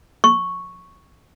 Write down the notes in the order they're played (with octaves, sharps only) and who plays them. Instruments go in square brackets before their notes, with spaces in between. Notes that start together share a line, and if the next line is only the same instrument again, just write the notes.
[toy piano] C#6